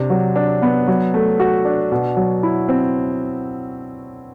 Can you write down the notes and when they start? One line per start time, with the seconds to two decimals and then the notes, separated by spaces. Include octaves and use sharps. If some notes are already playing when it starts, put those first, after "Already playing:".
Already playing: C3 D4
0.10 F#3
0.36 D4
0.62 B3
0.88 F#3
1.14 A3
1.40 F#4
1.65 D4
1.92 B2
2.17 F#3
2.43 E4
2.69 C4